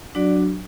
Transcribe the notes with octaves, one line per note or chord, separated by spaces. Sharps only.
F#3 D4 F#4 D5